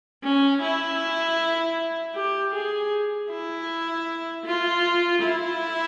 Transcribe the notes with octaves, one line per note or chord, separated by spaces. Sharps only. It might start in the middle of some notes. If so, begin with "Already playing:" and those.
C#4
E4
G4
G#4
E4
F4
E4